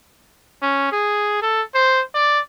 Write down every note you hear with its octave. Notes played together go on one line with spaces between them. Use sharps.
C#4
G#4
A4
C5
D5